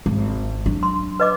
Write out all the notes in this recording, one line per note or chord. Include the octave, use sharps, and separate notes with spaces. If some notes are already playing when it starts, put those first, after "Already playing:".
G#1
F#3 D4
C6
B4 D#5 D6